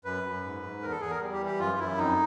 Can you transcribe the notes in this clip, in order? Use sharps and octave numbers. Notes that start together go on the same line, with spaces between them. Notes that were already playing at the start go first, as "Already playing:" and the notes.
F#2 B4
F#2
G#2
G#2
E2 A#4
A4
E2 G#4
A#4
G3
G4
E3
G4
F#2 F4
F#2 E4
F2 D#4